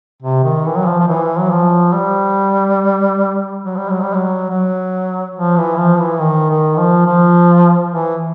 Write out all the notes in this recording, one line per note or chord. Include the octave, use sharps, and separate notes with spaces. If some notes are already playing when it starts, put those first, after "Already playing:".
C3
D#3
E3
F#3
F3
F3
E3
F#3
F3
G3
F#3
G3
F#3
G3
F#3
F#3
F3
E3
F3
E3
D#3
D#3
F3
F3
E3